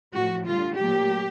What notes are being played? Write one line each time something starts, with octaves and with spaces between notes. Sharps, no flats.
A2 F3 A3 F#4
D3 G3 F4
A#2 F#3 A3 G4